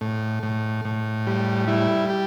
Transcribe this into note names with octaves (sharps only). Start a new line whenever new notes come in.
A2
A2
A2
G3
G3 E4
G4